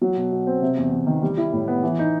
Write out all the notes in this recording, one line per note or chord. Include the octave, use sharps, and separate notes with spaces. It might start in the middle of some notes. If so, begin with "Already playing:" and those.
F#3
B2
B2
C4
C3
E2
E2
D#3
G3
E4
A2
B3
E3
D#4